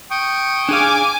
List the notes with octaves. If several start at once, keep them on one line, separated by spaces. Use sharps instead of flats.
G5 C#6 D#6
D4 G#4 F5 G#5 D6